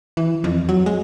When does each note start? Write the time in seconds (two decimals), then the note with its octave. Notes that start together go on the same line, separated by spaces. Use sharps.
0.17 E3
0.44 F2
0.69 F#3
0.86 G#3